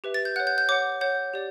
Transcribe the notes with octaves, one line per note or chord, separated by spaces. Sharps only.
G4 B4 E5
A6
G6
C#5 F#5 F#6
G6
G6
C#5 F#5 D6
C#5 F#5 G6
G4 D5